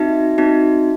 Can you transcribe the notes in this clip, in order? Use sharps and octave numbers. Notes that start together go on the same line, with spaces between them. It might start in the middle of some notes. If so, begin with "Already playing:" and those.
Already playing: C4 D#4 F#4 E5
C4 D#4 F#4